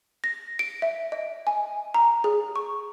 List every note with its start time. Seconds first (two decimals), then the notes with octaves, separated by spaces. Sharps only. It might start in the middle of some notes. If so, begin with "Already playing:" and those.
0.24 A#6
0.59 D7
0.82 E5
1.12 D#5
1.47 G#5
1.94 A#5
2.24 G#4
2.56 C#6